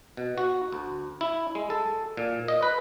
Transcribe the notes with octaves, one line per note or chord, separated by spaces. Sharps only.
B2
F#4
D2
E4
G#3
A4
A#2
D#5
B4